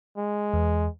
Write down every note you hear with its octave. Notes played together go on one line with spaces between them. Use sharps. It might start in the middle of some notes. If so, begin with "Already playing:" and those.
G#3
E2